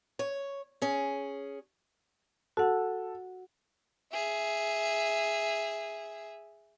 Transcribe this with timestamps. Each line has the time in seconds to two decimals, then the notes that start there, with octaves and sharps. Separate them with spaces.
0.19 C#5
0.82 C#4 G#4
2.57 F#4 A4 F#5
4.13 G#4 E5